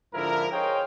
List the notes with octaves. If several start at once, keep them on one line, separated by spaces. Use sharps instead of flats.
G#2 D3 F3 E4 A#4
G#4 C5 C#5 D#5 F5 G5